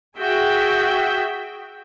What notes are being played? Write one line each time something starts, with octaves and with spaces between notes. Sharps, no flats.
F#4 G#4 E5 G5